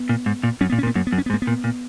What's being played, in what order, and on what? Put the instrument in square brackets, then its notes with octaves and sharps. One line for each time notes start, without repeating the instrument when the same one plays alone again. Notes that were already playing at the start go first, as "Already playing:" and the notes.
Already playing: [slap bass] B3
[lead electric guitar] A#2
G#2
A#2
[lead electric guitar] F#2 [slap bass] C#4
[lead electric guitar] A#2 [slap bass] B3
[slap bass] C#4
[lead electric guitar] A#2
[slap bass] B3
[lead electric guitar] F#2 [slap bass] A#3
[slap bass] B3
[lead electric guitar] F#2
[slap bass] C#4
B3
[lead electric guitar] G#2
[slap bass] A#3
B3
[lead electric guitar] A#2
A#2